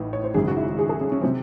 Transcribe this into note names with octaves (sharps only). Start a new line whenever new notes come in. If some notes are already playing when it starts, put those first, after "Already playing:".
Already playing: A1 A2 E3 D#4
C#5
C5
G#1 F#2 C#3 G#4
F#4
E4
G#4
A4
C#4
C#4
C3 F#3 C4